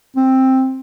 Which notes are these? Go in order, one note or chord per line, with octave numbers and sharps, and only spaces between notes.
C4